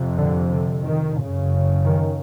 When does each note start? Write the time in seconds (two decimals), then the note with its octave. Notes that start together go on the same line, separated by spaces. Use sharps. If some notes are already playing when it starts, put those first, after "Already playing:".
Already playing: F2 C3
0.17 D3
0.50 D3
0.83 D#3
1.17 F#2 C#3
1.84 D#3